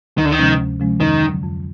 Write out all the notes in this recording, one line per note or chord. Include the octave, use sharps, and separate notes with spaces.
D2 D#3
D3
D#3
C3 F3 G#3 C#4
D2
C3 F3 G#3 C#4
F2 D#3
D3
F#3
F2